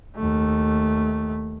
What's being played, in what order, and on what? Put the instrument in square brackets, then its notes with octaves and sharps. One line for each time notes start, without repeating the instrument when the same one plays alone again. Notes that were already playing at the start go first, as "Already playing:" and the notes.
[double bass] D#2 A3